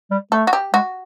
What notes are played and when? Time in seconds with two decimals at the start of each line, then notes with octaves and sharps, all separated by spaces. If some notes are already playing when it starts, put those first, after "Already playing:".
0.11 G3
0.32 A3 A4
0.47 F#4
0.53 G4
0.73 G#3 F#4